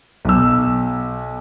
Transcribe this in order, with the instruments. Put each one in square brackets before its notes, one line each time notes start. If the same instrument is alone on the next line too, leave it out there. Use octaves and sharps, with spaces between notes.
[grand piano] B1 E6